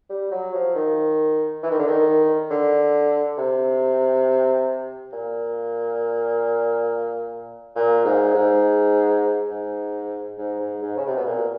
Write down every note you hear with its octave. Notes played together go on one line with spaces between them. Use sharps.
G3
F#3
F3
D#3
E3
D#3
D3
D#3
D3
C3
A#2
A#2
G#2
G#2
G#2
G#2
G#2
G#2
C#3
C3
B2
A#2